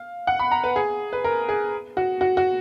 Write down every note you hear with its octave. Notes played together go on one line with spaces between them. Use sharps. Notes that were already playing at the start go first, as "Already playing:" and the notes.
Already playing: F5
F#5
B5
A#5
B4
G#4
B4
A#4
G#4
F#4
F#4
F#4